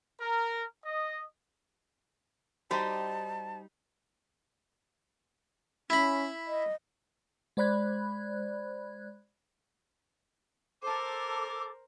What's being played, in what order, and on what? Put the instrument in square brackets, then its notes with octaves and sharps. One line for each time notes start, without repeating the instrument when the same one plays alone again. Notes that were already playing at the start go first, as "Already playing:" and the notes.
[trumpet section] A#4
D#5
[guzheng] G3 D#4 [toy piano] F#4 A#5 [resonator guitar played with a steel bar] G4 C5 D#5 [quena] A5
[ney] C#4 [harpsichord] E4 B5
[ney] D#5
[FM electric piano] G#3 C5 D5 B5 F#6 G#6
[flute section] A4 D6 [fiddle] A#4 C5